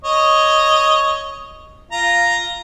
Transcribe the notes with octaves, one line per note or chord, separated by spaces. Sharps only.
C#5 D#5
F4 A#5